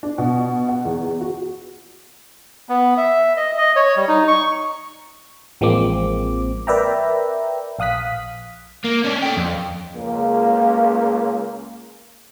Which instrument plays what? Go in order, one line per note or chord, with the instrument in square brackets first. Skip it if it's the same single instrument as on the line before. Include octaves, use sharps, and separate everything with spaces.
[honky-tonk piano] D4
B2
F#5
E2
F#4
[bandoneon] B3
E5
D#5
D#5
C#5
G3
D#4
C#6
[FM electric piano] A1 F3 G#3 A#3 C4 D6
A#4 B4 D5 E5 G5 A#5
A#1 F5 D#6 F#6 B6
[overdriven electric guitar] A#3
C#4 D4
A4 G5
F2
[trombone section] C#2 A#3